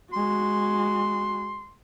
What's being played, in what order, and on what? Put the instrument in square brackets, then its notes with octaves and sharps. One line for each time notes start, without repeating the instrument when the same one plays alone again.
[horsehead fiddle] G#3 F#4 [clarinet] C6